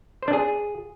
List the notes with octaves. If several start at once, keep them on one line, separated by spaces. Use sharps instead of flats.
C5
D4
G#4